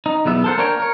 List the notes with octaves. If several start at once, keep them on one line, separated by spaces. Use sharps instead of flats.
D#4
B1 E2 B3 E5
A4 A#4 C5 F#5
A#3 D4 A#4 C#5 G5
A#4 C#5